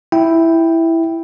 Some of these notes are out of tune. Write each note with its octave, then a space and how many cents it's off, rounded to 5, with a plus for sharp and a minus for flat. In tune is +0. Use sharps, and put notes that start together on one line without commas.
E4 +0 G5 +0